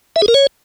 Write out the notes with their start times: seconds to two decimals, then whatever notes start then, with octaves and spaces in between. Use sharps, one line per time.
0.16 E5
0.22 G#4
0.28 A#4
0.34 C#5